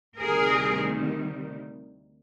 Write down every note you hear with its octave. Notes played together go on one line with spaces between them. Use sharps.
D2 C3 D#3 G3 G#4 A#4